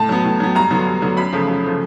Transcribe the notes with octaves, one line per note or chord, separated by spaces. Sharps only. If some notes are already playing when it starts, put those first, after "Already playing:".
Already playing: A2 A5
F#3 B3
A2
F#3 B3
G2 A#5
D3 F#3 B3
G2
D3 F#3 B3
F#2 B5
C#3 F3 A3
F#2
C#3 F3 A3